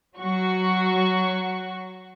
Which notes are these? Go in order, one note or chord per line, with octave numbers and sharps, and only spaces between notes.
F#3 F#4 C#6